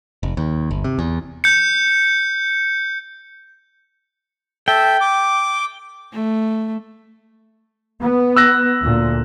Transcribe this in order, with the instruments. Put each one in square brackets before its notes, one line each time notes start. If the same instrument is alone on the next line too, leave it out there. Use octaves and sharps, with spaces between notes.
[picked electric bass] F1
D#2
G1
C3
E2
[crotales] G6 C#7
[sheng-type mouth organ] A4 E5 [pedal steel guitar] G5
[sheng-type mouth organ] D6
[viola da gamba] A3
[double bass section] B3
[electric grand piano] E6 F#6 A#6
[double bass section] D2 A#2